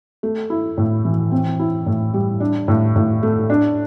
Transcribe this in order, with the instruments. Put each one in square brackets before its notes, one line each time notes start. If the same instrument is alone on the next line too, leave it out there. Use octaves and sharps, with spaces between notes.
[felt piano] A3
E4
A2
E3
C4
E4
A2
G3
D4
A2
A2
A3
D4